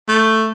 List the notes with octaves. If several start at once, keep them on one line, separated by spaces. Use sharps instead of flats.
A3